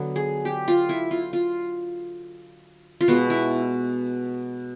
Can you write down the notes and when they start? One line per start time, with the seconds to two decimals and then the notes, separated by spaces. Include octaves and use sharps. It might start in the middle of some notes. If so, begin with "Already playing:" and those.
Already playing: D3 F#3 B3
0.16 G#4
0.45 G4
0.68 F4
0.89 E4
1.11 F4
1.33 F4
3.01 F4
3.08 B2 G#3 B3 F#4
3.30 E4